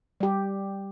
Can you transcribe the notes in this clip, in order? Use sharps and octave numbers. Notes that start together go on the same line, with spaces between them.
G3 G4